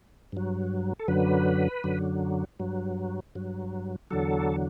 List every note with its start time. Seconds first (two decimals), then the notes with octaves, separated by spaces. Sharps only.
0.32 G2 F#3
0.99 A4
1.08 F#2 D3 F#3 B4
1.84 F#2 D3 F#3
2.60 G2 F#3
3.35 G2 F#3
4.11 E2 D3 F#3 A4